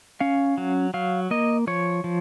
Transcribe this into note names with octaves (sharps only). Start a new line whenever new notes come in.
C#4 F5
F#3
F#3 F5
A#3 D#5
F3 C#5
F3